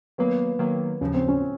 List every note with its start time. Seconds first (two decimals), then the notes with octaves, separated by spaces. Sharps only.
0.18 D#3 F#3 A#3 B3
0.59 D#3 F#3 A#3
1.01 D#2 C#3 F3 C#4
1.14 C4
1.28 C#4